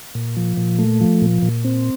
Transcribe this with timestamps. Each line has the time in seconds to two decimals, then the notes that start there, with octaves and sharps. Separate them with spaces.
0.15 A#2
0.37 F3
0.57 A#2
0.79 A3
1.01 F3
1.22 A#2
1.42 A#2
1.65 C4